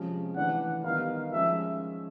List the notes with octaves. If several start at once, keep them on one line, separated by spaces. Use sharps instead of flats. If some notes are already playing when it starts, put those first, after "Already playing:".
Already playing: C3 F3 G#3 C#4
E3 A3 D4 F#5
D#3 G3 B3 D#4 F5
F3 G#3 C#4 E5